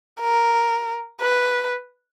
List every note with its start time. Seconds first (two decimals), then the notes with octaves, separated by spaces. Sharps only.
0.21 A#4
1.21 B4